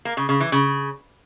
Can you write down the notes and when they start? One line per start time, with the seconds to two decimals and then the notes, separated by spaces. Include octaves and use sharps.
0.05 A#3
0.17 C#3
0.29 C#3
0.40 E3
0.52 C#3